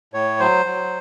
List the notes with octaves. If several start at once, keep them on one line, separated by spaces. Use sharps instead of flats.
A2 C#5
F#3 C5
F#3